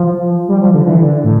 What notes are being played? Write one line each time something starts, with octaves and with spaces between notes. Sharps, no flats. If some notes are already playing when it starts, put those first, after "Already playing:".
Already playing: F3
G3
F3
D3
E3
D3
A2